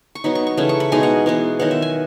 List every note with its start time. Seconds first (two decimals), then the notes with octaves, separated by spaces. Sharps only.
0.15 C#6
0.24 F#3 B3 D#4 B5
0.35 C#6
0.47 C#6
0.57 C#3 E3 A3 B5
0.69 C#6
0.80 B5
0.92 B2 G#3 D#4 G#5
1.03 F#5
1.26 E3 G#3 B3
1.60 D#3 F#3 B3 F#5
1.71 E5
1.82 G#5